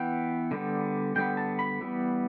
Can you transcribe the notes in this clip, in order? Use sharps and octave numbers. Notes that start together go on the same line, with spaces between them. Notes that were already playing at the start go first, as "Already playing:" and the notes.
Already playing: E3 B3 G5
D3 G3 B3
D3 G3 B3 G5
A5
B5
E3 G3 B3